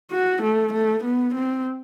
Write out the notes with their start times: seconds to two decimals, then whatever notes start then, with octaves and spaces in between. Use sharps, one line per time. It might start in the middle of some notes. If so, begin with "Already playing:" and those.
0.11 F#4
0.42 A3
0.73 A3
1.04 B3
1.35 C4